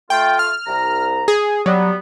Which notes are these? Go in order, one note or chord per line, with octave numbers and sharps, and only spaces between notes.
A3 F4 G5
F6
C2 A#5
G#4
F#3 G3 B3